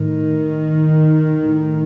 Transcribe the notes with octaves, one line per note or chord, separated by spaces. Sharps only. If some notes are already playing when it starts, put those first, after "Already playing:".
Already playing: A2 D#3
A2